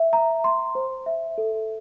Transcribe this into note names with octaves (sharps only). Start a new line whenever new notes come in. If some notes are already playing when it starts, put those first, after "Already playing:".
Already playing: E5
A#5
C6
C5
E5
A4